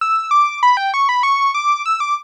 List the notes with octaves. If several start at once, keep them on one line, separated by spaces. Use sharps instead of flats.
E6
D6
B5
G5
C#6
B5
C#6
D6
E6
D6